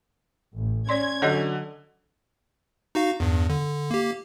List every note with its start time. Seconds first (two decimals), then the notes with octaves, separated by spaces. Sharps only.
0.57 A1
0.89 C#4 C#5 D5 C6 G#6
1.22 D3 F#3 A4 C#5 D#5
2.95 D#4 F#4 F5
3.20 E2 G2
3.49 D3
3.91 A#3 G4